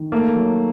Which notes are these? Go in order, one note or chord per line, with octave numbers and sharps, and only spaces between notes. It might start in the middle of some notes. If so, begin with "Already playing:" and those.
Already playing: D#3
A3 A#3
F#3